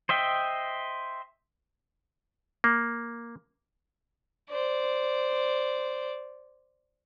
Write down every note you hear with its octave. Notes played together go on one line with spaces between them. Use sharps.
C5 D#5 E5 G5
A#3
C5 D5